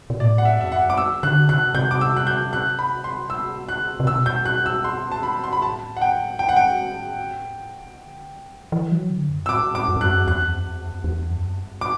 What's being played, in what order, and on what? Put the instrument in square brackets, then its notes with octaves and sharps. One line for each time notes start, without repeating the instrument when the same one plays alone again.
[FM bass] B2
[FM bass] A2 [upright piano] D5
[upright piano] F#5
E5
[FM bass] F#2 [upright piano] E5
[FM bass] E2
[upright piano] F#5
[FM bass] F#2
[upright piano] D6
E6
[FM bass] D3 [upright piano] F#6
[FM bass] C3 [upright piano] F#6
[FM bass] C3 [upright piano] G6
[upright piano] D6
E6
F#6
G6
F#6
B5
C6
E6
F#6
[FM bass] C3
[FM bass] B2 [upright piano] E6
[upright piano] G6
F#6
E6
C6
A5
B5
C6
B5
[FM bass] A2 [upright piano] A5
[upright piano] F#5
G5
[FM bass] G2 [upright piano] G5
[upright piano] F#5
[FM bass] A2 [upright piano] G5
[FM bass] G2
B2
A2
B2
C3
D3
F#3
D3
E3
F#3
D3
F#2
[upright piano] E6
[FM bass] A2 [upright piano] D6
[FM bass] B2
A2
[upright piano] D6
[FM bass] F#2
G2
[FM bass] F#2 [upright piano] F#6
[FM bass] E2 [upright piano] F#6
[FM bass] F#2
E2
F#2
E2
F#2
G2
[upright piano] D6